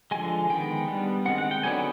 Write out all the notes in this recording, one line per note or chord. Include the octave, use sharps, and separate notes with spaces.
D3 F3 G#3 G#5
D#3 G#3 B3 G5
G3 B3 D4
D#3 G#3 C4 F#5
F#5
G5
D3 F#3 B3 D4 G#5